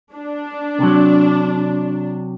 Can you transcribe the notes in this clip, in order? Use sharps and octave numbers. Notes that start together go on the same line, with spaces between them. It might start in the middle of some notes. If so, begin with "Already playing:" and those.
D4
C3 F#3